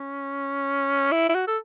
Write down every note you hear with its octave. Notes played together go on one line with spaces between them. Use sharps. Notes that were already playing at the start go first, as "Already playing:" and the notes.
Already playing: C#4
E4
E4
F#4
A4